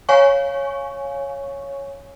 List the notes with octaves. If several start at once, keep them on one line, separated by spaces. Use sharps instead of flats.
C#5 F5 G#5 C#6